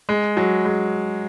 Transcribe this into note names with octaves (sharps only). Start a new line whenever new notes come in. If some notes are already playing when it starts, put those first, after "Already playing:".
G#3
F#3
G#3